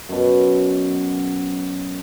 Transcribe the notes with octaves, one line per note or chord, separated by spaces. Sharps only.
F#2 B2